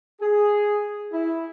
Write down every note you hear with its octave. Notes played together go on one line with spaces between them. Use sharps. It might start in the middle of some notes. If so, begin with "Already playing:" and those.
G#4
E4